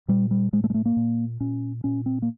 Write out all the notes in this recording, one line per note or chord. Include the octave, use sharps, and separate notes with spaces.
A#2 G3
G3
A2 G#3
A3
G#3
A3
A#3
A#2
A#2 C#4
A#2 C#4
C4
A#3